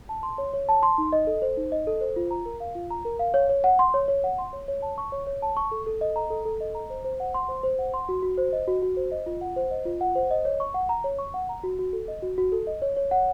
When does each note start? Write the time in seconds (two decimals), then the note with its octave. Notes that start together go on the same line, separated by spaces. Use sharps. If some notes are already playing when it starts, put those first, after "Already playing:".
0.09 A5
0.23 C6
0.38 C#5
0.53 C#5
0.69 A5
0.83 C6
0.98 D#4
1.13 D#5
1.27 A4
1.42 C5
1.57 D#4
1.72 D#5
1.87 A4
2.01 C5
2.16 F4
2.31 A#5
2.46 A#4
2.60 F5
2.75 F4
2.90 A#5
3.05 A#4
3.19 F5
3.34 C#5
3.49 C#5
3.64 F#5
3.79 C6
3.94 C#5
4.08 C#5
4.24 F#5
4.38 C6
4.53 C#5
4.68 C#5
4.82 A5
4.98 C#6
5.12 C#5
5.27 C#5
5.42 A5
5.57 C#6
5.71 A4
5.86 A4
6.01 D#5
6.16 A#5
6.30 A4
6.45 A4
6.61 D#5
6.75 A#5
6.90 C5
7.04 C5
7.20 F#5
7.34 C6
7.48 C5
7.63 C5
7.79 F#5
7.94 C6
8.09 F#4
8.22 F#4
8.38 C5
8.53 D#5
8.68 F#4
8.82 F#4
8.97 C5
9.11 D#5
9.26 F4
9.41 F#5
9.56 C5
9.71 D#5
9.86 F4
10.01 F#5
10.15 C5
10.31 D#5
10.45 C#5
10.60 C#6
10.74 F#5
10.89 A#5
11.04 C#5
11.19 C#6
11.34 F#5
11.49 A#5
11.64 F#4
11.79 F#4
11.93 A4
12.08 D#5
12.22 F#4
12.38 F#4
12.52 A4
12.67 D#5
12.82 C#5
12.97 C#5
13.11 F#5